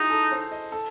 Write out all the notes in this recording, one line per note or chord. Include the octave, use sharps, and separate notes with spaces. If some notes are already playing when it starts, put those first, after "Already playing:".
Already playing: D#4 E4 F#4 G#4
A4
C5
D#5
A4